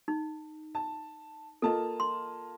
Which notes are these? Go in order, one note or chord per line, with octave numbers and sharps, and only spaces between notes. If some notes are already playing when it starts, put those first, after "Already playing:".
D#4
A5
A#3 F4 A4 D#5 A5
C6